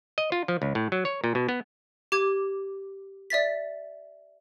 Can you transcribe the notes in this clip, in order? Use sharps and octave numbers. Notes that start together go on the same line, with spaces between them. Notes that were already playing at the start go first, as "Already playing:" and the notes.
D#5
F4
F3
C#2
A2
F#3
C#5
A#2
B2
B3
G4 D6 G#6
D5 E5 A6 B6